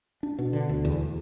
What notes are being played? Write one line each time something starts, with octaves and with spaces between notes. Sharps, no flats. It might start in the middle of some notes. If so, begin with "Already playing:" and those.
D4
B2
D3
D2
E2